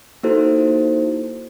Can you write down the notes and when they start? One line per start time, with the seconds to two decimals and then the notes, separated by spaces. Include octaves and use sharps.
0.23 A#3 D#4 E4 F#4 A4 C5